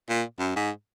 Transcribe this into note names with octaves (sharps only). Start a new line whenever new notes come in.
A#2
F#2
G#2